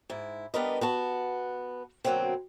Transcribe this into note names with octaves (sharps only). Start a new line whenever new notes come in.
G#2 E4
G3 B3 D4 A#4 B4 D#5
B3 F#4 A5
B2 D3 F#3 A3 A#3 C4